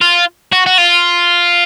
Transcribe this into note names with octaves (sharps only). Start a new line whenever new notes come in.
F4
F#4
F#4
F4